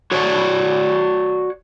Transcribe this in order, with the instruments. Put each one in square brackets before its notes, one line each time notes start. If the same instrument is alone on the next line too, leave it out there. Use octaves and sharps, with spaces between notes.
[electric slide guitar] F#4 C#5 D5